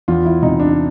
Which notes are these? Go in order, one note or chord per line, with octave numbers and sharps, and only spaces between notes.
E2 F4
E4
C3 D#4
D4